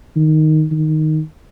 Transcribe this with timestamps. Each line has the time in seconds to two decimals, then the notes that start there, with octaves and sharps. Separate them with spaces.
0.16 D#3
0.71 D#3